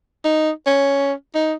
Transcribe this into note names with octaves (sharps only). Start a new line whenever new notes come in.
D#4
C#4
D#4